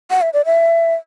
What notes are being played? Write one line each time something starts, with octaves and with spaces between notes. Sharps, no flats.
F#5
E5
D5
E5